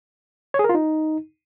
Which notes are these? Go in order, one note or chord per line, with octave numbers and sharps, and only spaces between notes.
C#5
G#4
A#4
F4
D#4